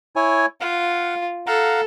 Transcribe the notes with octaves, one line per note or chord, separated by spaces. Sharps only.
E4 C#5 G#5
F4 F5 F#5
A4 F5 F#5 A#5